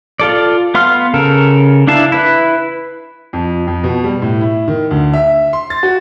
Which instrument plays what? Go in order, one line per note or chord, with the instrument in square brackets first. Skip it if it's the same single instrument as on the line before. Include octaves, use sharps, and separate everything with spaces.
[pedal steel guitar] F4 A4 D5
B3 F5 C6 F6
C#3 A4 A#4
D4 E4 F5 A5
E4 B4
[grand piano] F2
F2
B2
G3
A2
E4
D#3
D2
E5
C6
A6
F#4